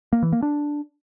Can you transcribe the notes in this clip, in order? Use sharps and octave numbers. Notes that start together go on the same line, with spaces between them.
A#3
E3
A#3
D4